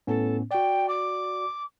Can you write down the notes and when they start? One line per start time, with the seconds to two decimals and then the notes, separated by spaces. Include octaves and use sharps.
0.07 A2 B3 C#4 A4
0.51 F#4 D5 G5
0.88 D6